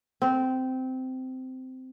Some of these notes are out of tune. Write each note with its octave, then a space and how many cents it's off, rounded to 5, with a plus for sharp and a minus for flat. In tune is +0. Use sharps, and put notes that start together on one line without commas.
C4 -15